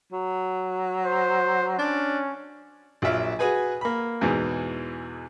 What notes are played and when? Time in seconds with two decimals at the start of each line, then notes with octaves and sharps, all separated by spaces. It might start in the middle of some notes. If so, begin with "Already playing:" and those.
0.12 F#3
1.05 C5
1.79 C#4 D4
3.02 A#1 F#3 F4 E5 F5
3.39 F#4 G#4 B4 G#5
3.81 A#3 B5
4.21 E2 G#2 B2 E3